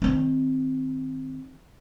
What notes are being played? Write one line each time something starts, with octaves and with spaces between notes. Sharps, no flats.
D#3 C4